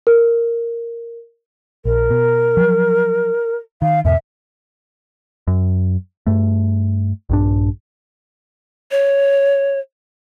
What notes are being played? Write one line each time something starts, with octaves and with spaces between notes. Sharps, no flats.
A#4
A#1 A#4
B2
F3 F#3
D#3 F5
E2 G#2 B2 E5
F#2
G2 A3
A#1 G2 D4
C#5